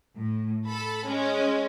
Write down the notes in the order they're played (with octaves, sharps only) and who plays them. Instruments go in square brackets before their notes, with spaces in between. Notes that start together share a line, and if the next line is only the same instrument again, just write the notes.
[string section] A2
A4 B5
G#3 C#4